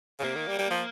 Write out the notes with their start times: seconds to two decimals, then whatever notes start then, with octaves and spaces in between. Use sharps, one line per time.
0.19 C#3
0.24 C3 A#3
0.35 D#3
0.47 G3
0.58 G3
0.71 F3